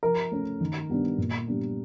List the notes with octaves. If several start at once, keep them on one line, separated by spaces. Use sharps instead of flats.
F3 A#4
A3 C#4
D#3
G3 B3 D4
A#2
G3 B3 D4